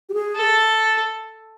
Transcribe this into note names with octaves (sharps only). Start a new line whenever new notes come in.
G4
G#4
A4